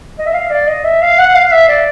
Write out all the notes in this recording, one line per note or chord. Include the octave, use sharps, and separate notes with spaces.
D#5
E5
F5
D5
D#5
E5
F5
F#5
F5
E5
D5